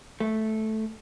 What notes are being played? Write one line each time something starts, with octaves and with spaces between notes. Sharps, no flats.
A3